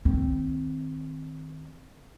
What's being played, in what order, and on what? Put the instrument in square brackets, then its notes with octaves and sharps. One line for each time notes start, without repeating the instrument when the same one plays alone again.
[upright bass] D#3 C4